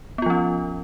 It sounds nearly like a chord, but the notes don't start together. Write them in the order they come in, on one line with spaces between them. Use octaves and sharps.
B3 F4 F3 C#4